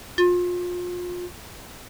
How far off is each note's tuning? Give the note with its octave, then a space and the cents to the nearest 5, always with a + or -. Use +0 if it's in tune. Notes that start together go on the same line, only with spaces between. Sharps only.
F4 +30